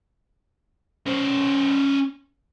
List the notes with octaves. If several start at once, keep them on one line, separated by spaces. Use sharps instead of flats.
C#4 C5